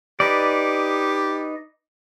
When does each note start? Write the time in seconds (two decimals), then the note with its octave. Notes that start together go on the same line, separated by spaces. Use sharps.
0.20 D#4 G4 B4 D5